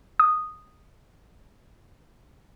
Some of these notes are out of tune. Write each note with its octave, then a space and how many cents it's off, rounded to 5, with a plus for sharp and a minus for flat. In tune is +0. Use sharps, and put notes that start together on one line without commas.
D#6 -5